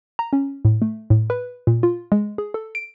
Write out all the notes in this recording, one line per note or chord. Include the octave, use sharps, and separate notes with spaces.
A#5
C#4
A2
A3
A2
B4
A#2
F4
G#3
G#4
A4
D7